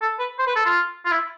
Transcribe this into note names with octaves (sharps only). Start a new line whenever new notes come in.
A4
B4
C5
B4
A4
F4
F4
E4